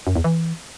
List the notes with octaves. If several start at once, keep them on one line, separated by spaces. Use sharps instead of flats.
F#2
E2
E3